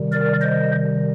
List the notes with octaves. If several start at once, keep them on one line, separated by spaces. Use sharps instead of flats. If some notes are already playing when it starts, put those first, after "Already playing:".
Already playing: C3 D#3 G3
A#4 D5
C5 D#5